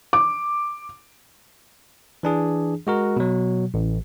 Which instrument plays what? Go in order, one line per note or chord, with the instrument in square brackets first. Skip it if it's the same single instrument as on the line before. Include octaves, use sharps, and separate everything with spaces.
[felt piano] D6
[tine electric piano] E3 D4 G#4
G#3 F#4 A#4
B2 F#3
A1